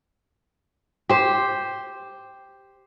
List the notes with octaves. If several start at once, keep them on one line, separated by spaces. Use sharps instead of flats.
G4 C5